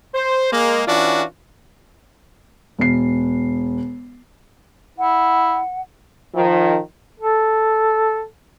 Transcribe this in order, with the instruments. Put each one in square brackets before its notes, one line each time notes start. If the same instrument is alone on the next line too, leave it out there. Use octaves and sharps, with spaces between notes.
[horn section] C5
G#3 A#3
E3 C#4 D4 F4 F#4
[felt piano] E1 C7
[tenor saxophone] E4 [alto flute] F#5
[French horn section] D#3 F3
[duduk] A4